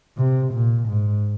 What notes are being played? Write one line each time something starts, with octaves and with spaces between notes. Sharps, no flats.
C3
A#2
G#2